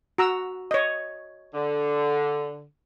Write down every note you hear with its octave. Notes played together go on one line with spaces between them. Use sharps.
F#4 A#5 E6
C#5 D#5
D3